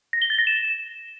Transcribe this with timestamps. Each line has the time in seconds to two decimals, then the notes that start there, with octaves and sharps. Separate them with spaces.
0.13 A#6
0.22 G7
0.30 A6
0.38 A#6
0.47 E7